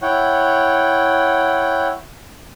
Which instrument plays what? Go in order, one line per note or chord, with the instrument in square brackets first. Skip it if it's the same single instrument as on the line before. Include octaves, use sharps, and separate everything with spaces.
[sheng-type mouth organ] E4 C#5 F#5 G5